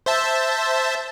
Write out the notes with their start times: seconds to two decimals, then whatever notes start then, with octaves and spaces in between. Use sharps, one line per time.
0.06 C5 E5 A5